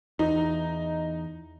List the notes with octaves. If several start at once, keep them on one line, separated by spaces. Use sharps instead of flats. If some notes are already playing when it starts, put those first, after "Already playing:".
E2 D#4